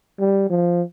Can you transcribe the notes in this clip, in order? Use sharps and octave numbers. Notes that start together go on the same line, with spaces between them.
G3
F3